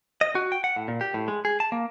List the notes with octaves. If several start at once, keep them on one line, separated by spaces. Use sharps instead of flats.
D#5
F#4
G5
F#5
A2
A#2
G4
A2
G#3
G#4
A5
A#3